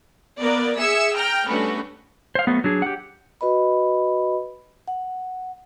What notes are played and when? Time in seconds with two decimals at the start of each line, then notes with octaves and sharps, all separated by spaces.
0.39 A#3 B3 A#4 D5
0.77 G#4 E5 E6 C#7
1.15 G5 A#5 F6
1.47 G3 A3 B3 C#4 D4 F#4
2.35 C5 F5
2.47 F#3 A3 B3
2.64 F#3 D4 G#4
2.82 G4 F#5
3.41 F#4 B4 D#5 B5
4.88 F#5